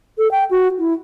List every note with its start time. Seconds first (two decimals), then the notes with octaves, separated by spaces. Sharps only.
0.18 A4
0.31 G5
0.51 F#4
0.79 E4